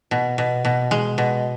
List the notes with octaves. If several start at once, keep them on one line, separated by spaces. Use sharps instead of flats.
B2
B2
B2
G#3
B2